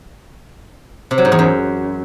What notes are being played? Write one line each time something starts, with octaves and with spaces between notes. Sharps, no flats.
C3
F#3
G#2
E2
F#2